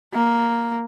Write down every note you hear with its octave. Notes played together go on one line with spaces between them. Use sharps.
A#3